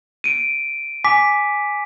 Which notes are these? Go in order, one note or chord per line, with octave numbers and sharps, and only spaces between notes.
D7 D#7
G#5 D6 B6